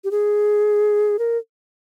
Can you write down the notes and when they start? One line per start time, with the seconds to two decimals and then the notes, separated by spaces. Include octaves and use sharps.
0.04 G4
0.11 G#4
1.19 A#4